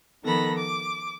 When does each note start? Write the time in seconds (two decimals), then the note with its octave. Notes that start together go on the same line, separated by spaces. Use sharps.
0.24 D#3 F3 B3 A4 B5 A#6
0.56 D6